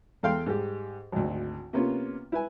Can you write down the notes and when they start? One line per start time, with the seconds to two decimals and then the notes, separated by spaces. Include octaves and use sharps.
0.23 E2 A4 F5 G5 C6
0.46 G#2 G3 G4
1.12 G#1 D2
1.73 C3 A#3 B3 C#4 F4
2.32 E4 B4 G#5